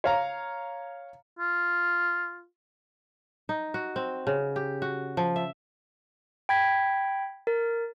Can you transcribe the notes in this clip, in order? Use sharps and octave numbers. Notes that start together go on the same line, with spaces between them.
C#5 F5 A#5
F4
D#4
F#4
C4
C#3
G4
F#4
F3
E5
G5 B5 G#6 B6
A#4 A6